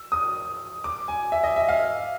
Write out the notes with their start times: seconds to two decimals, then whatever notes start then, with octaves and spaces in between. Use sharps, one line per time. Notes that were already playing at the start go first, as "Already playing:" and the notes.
Already playing: E6
0.12 D#6
0.84 D6
1.08 G#5
1.32 E5
1.43 D#5
1.56 E5
1.68 F5